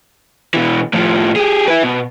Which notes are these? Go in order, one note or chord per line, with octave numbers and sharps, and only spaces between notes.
B2 E3
A2 F3
G4 G#4
E4 B4
B2